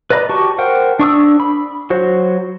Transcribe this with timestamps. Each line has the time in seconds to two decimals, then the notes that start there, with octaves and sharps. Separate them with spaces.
0.10 B4 D5 D#5 A#5 B5
0.29 F#4 G4 A5 C#6
0.58 A#4 C5 F#5 G5
0.99 D4 C#6 D#6 E6
1.40 B5
1.90 F#3 F#4 C5